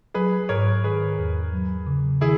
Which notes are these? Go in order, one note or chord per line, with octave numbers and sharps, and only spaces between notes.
F#3 G#4 B4
G#2 A#4 C#5
D#3 G#4 B4
E2
F#3
C#3
D#3 E4 G#4